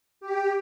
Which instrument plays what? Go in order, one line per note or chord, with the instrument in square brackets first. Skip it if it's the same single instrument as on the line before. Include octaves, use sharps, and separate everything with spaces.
[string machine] G4